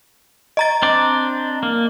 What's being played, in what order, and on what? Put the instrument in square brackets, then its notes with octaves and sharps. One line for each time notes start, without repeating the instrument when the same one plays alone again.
[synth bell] D#5 A#5 A6
[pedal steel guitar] C4 D4 D5
A#3